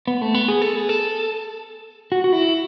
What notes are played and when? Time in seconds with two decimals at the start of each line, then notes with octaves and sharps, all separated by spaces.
0.07 B3
0.22 A3
0.34 B3
0.48 G#4
0.62 A4
0.76 G#4
0.89 A4
2.12 F#4
2.24 F#4
2.33 E4